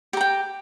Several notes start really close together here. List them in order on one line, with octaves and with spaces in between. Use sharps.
G4 A#5 G5